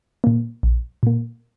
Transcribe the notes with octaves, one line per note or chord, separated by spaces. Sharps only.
A#2 A#3
A#1
A#2 A#3